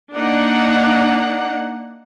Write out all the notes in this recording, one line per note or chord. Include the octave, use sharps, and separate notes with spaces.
A#3 D4 D#4 F#5